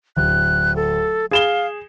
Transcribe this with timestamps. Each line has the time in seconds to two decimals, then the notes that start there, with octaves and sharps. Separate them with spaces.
0.16 D1 F#6
0.76 A4
1.31 G#4 F5 E7 G7